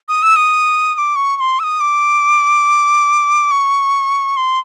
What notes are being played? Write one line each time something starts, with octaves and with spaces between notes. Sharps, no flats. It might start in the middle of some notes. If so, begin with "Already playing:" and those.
D#6
E6
D#6
D#6
D6
C#6
C#6
C6
E6
D#6
D6
C#6
C6